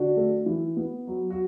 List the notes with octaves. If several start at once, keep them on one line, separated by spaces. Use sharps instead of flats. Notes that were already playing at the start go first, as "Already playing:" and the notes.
Already playing: D3 D4 F#4
A3
E3
B3
F#3
F#4